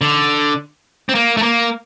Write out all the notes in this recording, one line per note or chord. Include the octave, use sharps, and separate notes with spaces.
D3
C4
A#3
A3
A#3